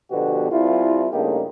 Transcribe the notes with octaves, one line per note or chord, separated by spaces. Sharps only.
B2 D3 F3 B3 F#4 G4
C2 E4 F4
G2 C#3 A3 A#3 D#4 G4